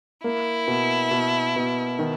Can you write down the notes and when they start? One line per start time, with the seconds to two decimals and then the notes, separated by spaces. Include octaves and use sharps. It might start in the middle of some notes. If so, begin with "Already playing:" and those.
0.24 A#3 E4
0.68 B2
1.11 B2
1.56 B2
1.99 D#3